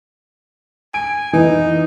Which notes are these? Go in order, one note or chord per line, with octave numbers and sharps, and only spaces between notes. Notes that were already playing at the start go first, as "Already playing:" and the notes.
G#5 D7
E3 D#4